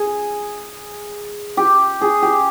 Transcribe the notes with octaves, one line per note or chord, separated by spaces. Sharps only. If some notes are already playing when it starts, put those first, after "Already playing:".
Already playing: G#4
G4
G#4
G4